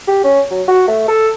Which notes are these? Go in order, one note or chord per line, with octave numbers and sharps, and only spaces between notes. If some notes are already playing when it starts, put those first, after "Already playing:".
G4
C#4
F#3
F#4
A3
A4